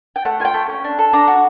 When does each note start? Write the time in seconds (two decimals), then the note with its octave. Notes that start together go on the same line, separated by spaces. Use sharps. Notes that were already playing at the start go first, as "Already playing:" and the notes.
0.16 G5
0.25 A3 F#5
0.40 F4 G#5
0.45 G5
0.54 A3
0.69 C#4
0.84 D4
0.99 A4
1.13 D4 A#5
1.28 F#4